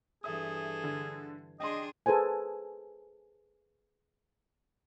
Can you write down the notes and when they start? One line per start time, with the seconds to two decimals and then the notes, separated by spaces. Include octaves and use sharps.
0.24 G2 E3 G#4 A4 E5 D#6
0.84 D3 G#6
1.60 D4 G#4 D#5 G5 C6
2.06 G#4 A4 B4 C5 G#5